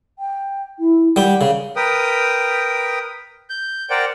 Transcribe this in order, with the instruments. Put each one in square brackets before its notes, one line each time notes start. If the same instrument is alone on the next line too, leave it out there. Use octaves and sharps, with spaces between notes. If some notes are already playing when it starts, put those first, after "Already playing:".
[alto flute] G5
E4
[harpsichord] G3 G4 [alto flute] F#5
[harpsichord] C#3
[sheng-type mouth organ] A#4 B4 G5 D#6
G6
A#4 C5 D5 F#5 G5